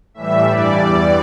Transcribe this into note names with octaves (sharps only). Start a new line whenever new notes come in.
A2 E3 G3 E5
G2 E3 G3 D5
E2 E3 G3